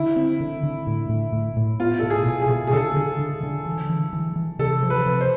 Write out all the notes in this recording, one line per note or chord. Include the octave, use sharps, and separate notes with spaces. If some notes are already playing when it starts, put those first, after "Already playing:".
Already playing: D3 E4
C4
D3
D3
A2
A2
A2
A2
B3 F4
B2 A4
G#4
B2
G#4
B2
G#4
D3 A4
D3
D3
D3
E3
E3
E3
E3
C3 A4
F3
B4
C3
C5